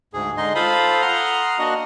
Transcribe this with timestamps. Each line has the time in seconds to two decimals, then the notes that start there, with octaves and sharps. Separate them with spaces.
0.13 D2 G#2 G#4
0.37 D3 G#3 D#4 D#5 C6
0.55 F4 A4 C5 F5 B5 D#6
1.02 F#5 A#5 C6 D#6 F6
1.59 A#3 D4 F#4 D#5 F#5